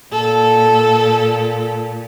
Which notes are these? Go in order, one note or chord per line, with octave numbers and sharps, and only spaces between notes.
A#2 A4